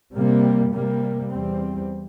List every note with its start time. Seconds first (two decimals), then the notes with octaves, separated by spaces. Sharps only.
0.15 C3 G3 A#3
0.73 C3 G3 A#3
1.32 E2 E3 G3 C4